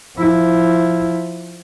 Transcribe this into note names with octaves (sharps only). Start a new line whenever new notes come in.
F3 E4